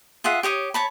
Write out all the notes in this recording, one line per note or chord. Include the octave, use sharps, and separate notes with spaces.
F4 G#4 E5 F#5
G4 C#5 D#6
C#5 A5 B5